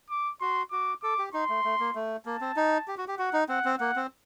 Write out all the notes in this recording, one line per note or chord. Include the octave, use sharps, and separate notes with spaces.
D6
F#4 C6
F#4 D6
A4 D6
G4
D#4 C6
A3
A3
A#3
A3
A#3 A5
C4
D#4
G4
F#4
G4
F#4 F#5
D#4
C4 F#5
C4
A#3 F#5
C4